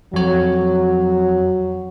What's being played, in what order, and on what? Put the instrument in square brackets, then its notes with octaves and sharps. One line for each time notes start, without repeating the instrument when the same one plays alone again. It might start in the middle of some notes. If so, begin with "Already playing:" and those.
[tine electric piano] F2 C#5 [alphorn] F#3